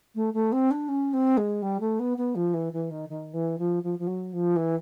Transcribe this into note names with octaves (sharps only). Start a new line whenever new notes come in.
A3
A3
C4
D4
C#4
C4
G#3
G3
A3
B3
B3
F3
E3
E3
D#3
D#3
E3
F3
F3
F3
F#3
F3
E3